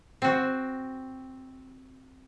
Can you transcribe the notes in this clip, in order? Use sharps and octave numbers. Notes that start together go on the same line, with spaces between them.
C4 F#4